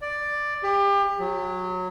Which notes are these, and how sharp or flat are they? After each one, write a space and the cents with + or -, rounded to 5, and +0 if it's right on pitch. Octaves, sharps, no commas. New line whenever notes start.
D5 +5
G4 +30
F#3 -15